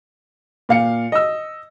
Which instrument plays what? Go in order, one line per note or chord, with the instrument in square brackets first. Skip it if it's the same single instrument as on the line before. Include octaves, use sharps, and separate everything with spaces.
[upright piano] A#2 F5 C#7
D#5 E6